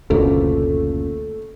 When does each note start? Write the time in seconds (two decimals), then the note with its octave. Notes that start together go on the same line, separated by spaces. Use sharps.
0.10 F#1 D2 B2 A3 A#3 C#4 F4